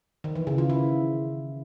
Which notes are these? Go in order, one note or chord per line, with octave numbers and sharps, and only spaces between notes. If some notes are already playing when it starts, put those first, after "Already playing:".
D#3
E3
C#3
F4
E4